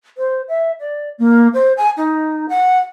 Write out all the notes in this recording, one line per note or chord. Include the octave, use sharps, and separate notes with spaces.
C5
E5
D5
A#3
C5
G#5
D#4
F#5